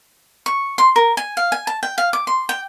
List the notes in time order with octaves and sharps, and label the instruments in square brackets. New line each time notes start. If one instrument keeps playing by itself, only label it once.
[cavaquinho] C#6
C6
A#4
G#5
F5
G#5
A5
G5
F5
D6
C6
G5